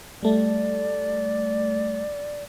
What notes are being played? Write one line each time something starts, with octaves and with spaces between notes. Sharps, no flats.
G3 A3 D5